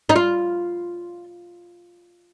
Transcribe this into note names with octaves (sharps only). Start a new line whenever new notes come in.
D#4
F4